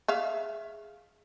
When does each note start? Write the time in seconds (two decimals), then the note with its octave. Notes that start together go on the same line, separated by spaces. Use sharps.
0.08 G#4 E5 F5